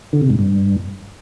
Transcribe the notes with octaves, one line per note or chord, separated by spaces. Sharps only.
D3
C3
G#2
G2